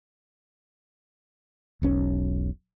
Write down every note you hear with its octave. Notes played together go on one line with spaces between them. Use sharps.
E1 B1 C#4